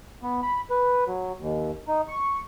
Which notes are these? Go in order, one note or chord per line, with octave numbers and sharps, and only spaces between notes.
B3
B5
B4
F#3
D#2
D#4
C#6